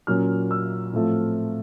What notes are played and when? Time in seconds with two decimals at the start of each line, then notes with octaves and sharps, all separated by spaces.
0.07 A#2 F#3 A#3 C#4 F6
0.51 E6
0.93 A2 F3 A3 C4